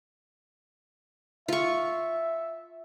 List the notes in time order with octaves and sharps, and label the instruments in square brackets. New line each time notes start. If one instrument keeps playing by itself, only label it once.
[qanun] F4 C#6 [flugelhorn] E5